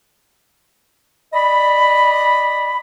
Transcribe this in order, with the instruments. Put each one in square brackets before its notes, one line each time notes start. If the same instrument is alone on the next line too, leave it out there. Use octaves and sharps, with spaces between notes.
[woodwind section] D5 D#5 B5